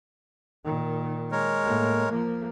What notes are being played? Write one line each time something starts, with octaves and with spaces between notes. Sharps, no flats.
A#2 D#3
G#3 A#4 C#5
A2 A#3
F3 A#3